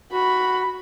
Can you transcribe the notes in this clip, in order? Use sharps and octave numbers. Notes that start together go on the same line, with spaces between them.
F#4 B5